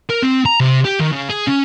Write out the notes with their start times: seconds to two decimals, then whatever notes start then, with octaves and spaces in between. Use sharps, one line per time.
0.10 A#4
0.22 C4
0.46 A#5
0.60 C3
0.85 G4
1.00 D#3
1.12 C#3
1.30 G#4
1.47 C#4